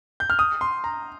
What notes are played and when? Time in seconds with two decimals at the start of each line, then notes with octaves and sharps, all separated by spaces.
0.20 G6
0.30 F6
0.39 D#6
0.61 C6
0.84 A#5